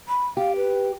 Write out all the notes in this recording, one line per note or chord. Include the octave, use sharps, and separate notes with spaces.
B5
G4 F5
B4